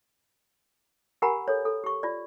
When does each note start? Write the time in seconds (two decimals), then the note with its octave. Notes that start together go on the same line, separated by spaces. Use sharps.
1.22 G4 A#4 F#5 G#5 A#5 B5
1.48 A4 C#5
1.65 A4
1.84 G4 C#6
2.03 F4 D5